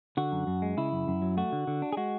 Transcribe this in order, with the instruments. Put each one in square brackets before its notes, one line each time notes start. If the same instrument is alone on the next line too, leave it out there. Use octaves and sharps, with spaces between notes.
[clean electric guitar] D3 F#4
F#2
F#2
G#3
C#3 E4
F#2
F#2
F#3
A3 F#4
D3
D3
D4
G#4
G#3 F#4